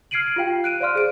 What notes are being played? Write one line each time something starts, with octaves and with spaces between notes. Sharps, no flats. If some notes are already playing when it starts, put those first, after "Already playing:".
F6 G#6 C7 D7 D#7 F#7
F4 G4 F5 G5
F#6 D7 D#7
C5 D5 F5 C6 F6
G#4 D7